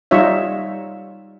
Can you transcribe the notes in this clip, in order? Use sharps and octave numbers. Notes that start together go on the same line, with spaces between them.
G3 D#4 F4 C#5 E5